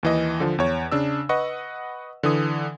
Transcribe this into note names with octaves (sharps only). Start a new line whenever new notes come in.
D#2 E3 D#5
D3 F3
E2 C#5
C#3 D4 E6
B4 D#5 F#5 C#6
D3 E3 D#6